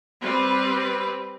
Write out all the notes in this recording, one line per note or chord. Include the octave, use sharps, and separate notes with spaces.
G3 C4 B4